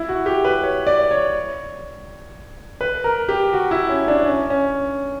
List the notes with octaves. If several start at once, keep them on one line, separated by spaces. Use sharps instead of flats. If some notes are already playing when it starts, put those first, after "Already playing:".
Already playing: E4
F#4
G4
B4
C#5
D5
C#5
B4
A#4
G4
F#4
E4
C#4
D4
C#4
C#4